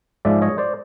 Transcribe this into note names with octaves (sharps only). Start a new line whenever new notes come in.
G#2 F3 G#3 D5 E5
C#5 D#5
C5 D5